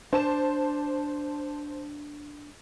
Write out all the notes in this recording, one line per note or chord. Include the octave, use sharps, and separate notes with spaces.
D4 C5 A5 E7